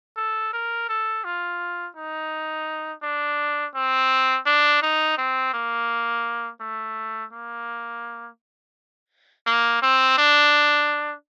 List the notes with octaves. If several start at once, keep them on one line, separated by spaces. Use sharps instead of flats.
A4
A#4
A4
F4
D#4
D4
C4
D4
D#4
C4
A#3
A3
A#3
A#3
C4
D4